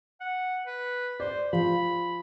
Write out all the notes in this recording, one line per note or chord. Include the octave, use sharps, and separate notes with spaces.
F#5
B4
C5 D5
F3 B5